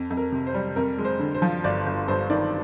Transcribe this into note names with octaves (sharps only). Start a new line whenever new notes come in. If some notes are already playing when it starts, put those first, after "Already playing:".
Already playing: F2
F2
A#4
C3
C5
G3
F2 A#4
G#3
C5
D3
C5
F3
G1 D5
G1
G2 C5
D#3 D5